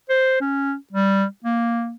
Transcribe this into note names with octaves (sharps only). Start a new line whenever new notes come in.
C5
C#4
G3
A#3